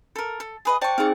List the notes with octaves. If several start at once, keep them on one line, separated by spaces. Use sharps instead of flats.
A4 A#4
A4
G#4 B4 D#5
C5 D5 G5 A5 C#6
C4 D#4 G#4 F5 C#6